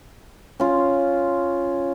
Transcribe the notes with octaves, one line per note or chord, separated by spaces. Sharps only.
C#4 F4